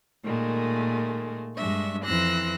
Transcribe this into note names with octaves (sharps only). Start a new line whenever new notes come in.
A#2 D#3 G#3 A3
G2 G#3 D4 E5 C#6
F2 E3 C6 E6 F#6 A#6